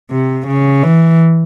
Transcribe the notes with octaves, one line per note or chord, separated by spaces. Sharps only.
C3
C#3
E3